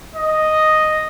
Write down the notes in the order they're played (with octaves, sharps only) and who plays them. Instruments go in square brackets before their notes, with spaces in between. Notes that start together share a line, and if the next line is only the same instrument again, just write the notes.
[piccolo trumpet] D#5